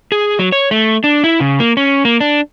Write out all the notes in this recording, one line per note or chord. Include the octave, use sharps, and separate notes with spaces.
G#4
F#3
C#5
A3
D4
E4
C#3
A#3
C#4
A#3
D4